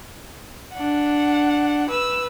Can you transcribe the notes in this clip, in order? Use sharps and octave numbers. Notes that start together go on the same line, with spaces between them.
D4 F#5
B4 E6